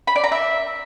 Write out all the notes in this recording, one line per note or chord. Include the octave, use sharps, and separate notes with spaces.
B5
D5
A#5
E5